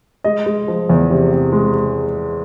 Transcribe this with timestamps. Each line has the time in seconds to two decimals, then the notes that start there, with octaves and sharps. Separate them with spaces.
0.24 G#3 D#5
0.46 G#3
0.68 F3
0.89 E2
1.10 C3
1.32 C3
1.53 G#3